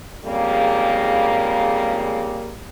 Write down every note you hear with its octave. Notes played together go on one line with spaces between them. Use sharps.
F2 G#2 C#3 G3 A#3